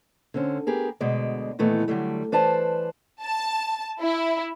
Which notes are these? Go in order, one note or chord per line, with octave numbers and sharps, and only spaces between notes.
D3 C4 C#4
B3 G4 G#4 A#4
D2 B2 G#3 D5
A#2 D#3 E3 A3 B3
D3 F#3 G3 A3
E3 B4 C5 D5 A5
A5
E4